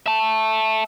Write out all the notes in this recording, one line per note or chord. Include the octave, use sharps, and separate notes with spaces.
E5 A5